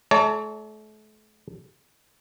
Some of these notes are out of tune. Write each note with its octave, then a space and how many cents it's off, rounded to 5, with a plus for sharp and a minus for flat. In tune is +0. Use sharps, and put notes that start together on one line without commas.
A3 -40 C#5 +40 A5 +40